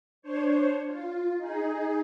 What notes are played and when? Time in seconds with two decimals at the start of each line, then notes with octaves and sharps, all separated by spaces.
0.22 D4 C5 C#5
0.87 F4
1.37 D#4 G#4